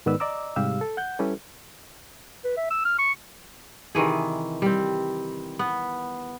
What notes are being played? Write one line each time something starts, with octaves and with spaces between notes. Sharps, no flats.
G#2 D#3 B3 B4 D5 E6
D5 D#5 A#5 D6 E6
G#2 C3 G3 G4 F5 E6
A4
F#5 G6
G3 C#4 E4 G4 A4 B4
B4
E5
E6
F6
C#6
C3 D#3 E3 G#4
G3 C4
B3